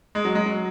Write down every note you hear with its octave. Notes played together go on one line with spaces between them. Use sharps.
G#3
F#3
G#3
F#3